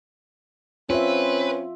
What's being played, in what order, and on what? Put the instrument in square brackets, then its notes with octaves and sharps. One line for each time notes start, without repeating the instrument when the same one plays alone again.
[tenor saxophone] C4 [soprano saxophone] C#4 [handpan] F4 E5 [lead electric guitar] B4